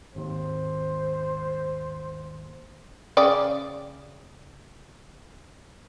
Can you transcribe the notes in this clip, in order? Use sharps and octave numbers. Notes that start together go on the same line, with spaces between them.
G#1 D#2 C5
C#3 D5 G5